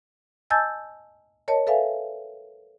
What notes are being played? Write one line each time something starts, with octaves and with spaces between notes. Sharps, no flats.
D#5 G#5 A5 E6 G6 A6
A#4 C#5 D#5 A5
A4 B4 E5 F5 G#5